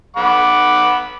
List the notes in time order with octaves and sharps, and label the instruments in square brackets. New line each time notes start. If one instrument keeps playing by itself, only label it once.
[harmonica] F#5 B5 D6